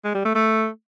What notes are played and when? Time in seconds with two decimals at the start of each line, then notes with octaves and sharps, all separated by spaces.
0.04 G#3
0.15 G3
0.25 A3
0.35 A3